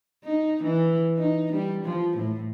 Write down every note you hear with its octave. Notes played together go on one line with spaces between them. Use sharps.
D#4
E3
D#4
G3
F3
A2